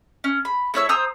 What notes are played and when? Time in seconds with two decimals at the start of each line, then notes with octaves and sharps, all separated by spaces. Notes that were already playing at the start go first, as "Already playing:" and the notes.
0.24 C#4
0.45 B5
0.74 A3 E4 C#5 E6
0.89 C5 A#5 D#6 E6